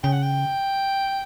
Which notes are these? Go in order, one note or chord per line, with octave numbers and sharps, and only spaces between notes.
C#3 G5
F#5
G5